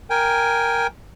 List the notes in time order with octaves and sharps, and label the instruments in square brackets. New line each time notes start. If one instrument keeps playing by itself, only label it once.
[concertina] A#4 G5 G#5